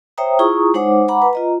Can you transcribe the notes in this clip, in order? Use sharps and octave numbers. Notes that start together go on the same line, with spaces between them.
C5 C#5 E5 G5 A#5 D#6
E4 F4 G#4 A#5 C#6 D#6
G#3 D#4 C5 C#5 F#5 D6
F#5 A#5 B5 D6
B4
F4 D#5 A#5